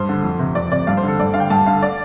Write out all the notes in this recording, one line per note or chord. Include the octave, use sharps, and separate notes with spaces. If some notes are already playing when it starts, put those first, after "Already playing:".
Already playing: G2 C5
D3
F2
C3
F2 D5
C3 D5
G2 F5
C5
D3 A4
G2 D5
D3 F5
G5
G2 A5
D3 F5
D5